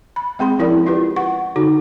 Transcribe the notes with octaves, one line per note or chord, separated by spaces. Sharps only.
B5
G#3 C4 G#4 C6
F3 C#4 E4 G#4 A#4 D5
E4 F4 G4 B4
F#5 C#6
D3 D#4 F#4